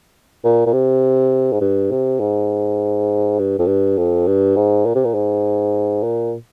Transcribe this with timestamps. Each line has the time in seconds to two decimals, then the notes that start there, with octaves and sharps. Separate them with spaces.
0.44 A#2
0.66 A#2
0.73 C3
1.52 G#2
1.61 G2
1.91 C3
2.20 G#2
3.39 G2
3.59 F2
3.67 G2
3.98 F2
4.27 G2
4.56 G#2
4.86 A#2
4.95 C3
5.05 A#2
5.14 G#2
6.03 A#2